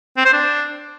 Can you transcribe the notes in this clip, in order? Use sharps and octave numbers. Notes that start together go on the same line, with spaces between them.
C4
C5
D4